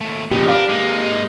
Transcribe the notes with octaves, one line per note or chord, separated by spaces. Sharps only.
D#2 A3
A#2 C#3 F3 B3 D#4 G4
D4 A#4 B4 F5
G#3 A#3 D#4